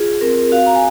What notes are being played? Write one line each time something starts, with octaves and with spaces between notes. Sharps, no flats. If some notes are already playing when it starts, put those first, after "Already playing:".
Already playing: F4 G#4
C4 A#4
F#4 F5
A#5
G#5